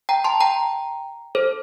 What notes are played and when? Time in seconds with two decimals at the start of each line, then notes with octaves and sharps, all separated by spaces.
0.09 G5 A#5
0.24 A5 C6
0.40 G5 A#5
1.35 A4 C5